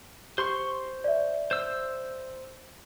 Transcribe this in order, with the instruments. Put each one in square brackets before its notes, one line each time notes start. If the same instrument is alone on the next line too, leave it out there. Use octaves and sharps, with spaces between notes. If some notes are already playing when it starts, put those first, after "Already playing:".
[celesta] G4 [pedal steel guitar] C5 C6 C#6
[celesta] D5 E5
[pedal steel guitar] C5 E6